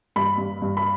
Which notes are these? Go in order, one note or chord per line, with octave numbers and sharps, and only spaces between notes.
G2 B5
G2
G2
B5